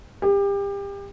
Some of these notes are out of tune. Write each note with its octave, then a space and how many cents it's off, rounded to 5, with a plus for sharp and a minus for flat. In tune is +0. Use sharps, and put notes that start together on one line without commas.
G4 +30